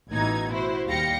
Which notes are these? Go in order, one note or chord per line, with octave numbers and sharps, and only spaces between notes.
A1 B2 E3 D#4 G#6
E4 F#4 C5
D#2 G3 F5 G5 A#6 C#7